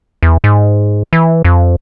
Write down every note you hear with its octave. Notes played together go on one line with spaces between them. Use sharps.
E2
G#2
E3
F2